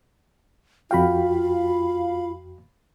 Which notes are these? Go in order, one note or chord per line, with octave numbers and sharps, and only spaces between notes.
F2 F4 F#4 F5 G5 B5